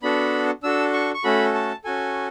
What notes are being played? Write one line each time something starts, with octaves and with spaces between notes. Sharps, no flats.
B3 D4 F#4 A4 B5
D4 F#4 A4 E6
C#6
C#6
A3 C#4 F#4 A4 B5
A5
C#4 F#4 A4 G#5